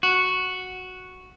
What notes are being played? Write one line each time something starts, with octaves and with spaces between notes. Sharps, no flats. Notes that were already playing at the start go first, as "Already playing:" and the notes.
F#4